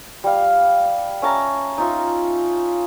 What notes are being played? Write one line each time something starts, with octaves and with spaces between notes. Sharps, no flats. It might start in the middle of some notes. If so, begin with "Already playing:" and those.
G3 F5
C#4 E5 A5 A#5
D#4 F4 E5